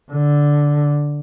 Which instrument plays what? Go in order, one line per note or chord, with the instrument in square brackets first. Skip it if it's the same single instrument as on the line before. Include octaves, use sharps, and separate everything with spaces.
[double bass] D3